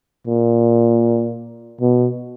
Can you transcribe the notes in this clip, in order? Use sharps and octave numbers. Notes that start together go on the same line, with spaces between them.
A#2
B2